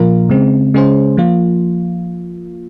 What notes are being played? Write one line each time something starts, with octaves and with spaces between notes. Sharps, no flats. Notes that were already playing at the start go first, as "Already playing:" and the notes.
Already playing: A#2 F3 A#3 F4 A#4
C#3 G#3 C4
C#3 G#3 C#4 G#4 C5
F3 A#3 F4